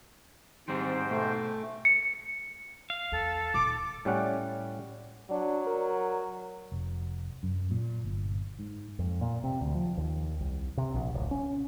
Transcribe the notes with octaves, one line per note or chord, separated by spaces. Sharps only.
G#2 D#3 G3 C4 C5 G5
B2 A3
C#7
F5
E2 A4
D#1 D6
A2 G3 C#4 F#5
F#3 D4
A#4
F1
F#2
A#2
G1
G#2
F2
A#2
C3
D2
F3
D#2
C2
C3
A#1
D1
C#4